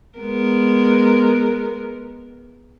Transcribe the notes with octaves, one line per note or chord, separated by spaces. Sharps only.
G#3 B3 A#4